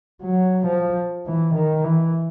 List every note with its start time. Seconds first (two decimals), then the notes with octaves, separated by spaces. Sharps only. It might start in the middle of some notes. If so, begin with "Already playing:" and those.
0.22 F#3
0.67 F3
1.26 E3
1.55 D#3
1.84 E3